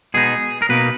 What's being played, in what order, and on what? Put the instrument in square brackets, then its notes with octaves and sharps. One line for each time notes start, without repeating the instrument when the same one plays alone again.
[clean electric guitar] B2 G#3 B3 D#4 G#4
A#4
B2 A#3 D#4 B4